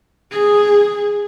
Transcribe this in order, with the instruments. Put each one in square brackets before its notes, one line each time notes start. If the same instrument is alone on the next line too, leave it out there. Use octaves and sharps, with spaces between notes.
[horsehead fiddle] G#4